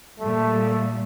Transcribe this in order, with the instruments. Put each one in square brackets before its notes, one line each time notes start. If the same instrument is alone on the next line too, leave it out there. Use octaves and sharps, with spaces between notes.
[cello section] A#2 G3 [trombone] A3